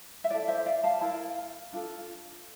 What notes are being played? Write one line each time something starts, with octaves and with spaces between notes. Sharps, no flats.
E5
E4 A4 D5
C5 E5
D5 F5
F5 A5
E4 A#4 F5 A5
D4 F4 A4